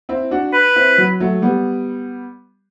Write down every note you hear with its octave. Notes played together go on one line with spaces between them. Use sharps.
C4 E4
D4 F#4
B4
C4 E4
F#3
F#3 A3
G3 B3